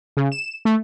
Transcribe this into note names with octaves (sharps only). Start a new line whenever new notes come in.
C#3
E7
A3